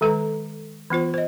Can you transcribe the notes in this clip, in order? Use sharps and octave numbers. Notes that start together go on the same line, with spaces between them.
D#3 G#3 A4 B4 A#5
E3 B3 F4 C5
C5 D#5